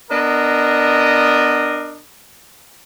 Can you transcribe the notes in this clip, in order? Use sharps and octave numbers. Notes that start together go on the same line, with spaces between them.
B3 D4 A#4 D#5